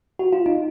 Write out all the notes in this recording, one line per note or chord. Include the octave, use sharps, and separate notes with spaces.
F#4
F4
D#4